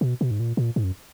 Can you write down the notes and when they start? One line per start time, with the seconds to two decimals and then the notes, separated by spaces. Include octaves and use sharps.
0.01 B2
0.21 B2
0.31 G#2
0.40 A#2
0.57 A#2
0.76 G#2
0.84 F#2